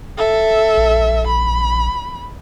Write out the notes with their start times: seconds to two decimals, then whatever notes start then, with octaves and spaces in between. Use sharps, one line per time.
0.18 A4 E5
0.77 A#1
1.27 B5